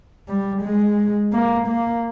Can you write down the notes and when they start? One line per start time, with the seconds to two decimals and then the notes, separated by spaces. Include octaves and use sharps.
0.28 G3
0.63 G#3
1.33 A#3
1.68 A#3